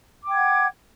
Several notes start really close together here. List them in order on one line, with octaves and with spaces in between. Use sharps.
D6 G5 G#6 F#5